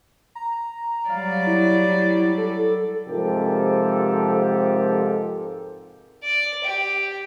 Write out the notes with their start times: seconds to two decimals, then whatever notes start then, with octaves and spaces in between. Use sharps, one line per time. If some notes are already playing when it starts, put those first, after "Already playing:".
0.35 A#5
1.10 F#3 G3 D5 F5
1.47 E4
2.38 A4
3.08 G#2 C3 F3 G4 A4 A#4
6.23 D5
6.64 G4